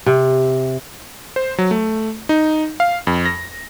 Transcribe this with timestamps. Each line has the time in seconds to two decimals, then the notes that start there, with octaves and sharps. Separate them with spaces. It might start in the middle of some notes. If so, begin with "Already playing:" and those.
0.06 C3
1.36 C5
1.58 F#3
1.71 A3
2.29 D#4
2.80 F5
3.07 F2
3.26 A#6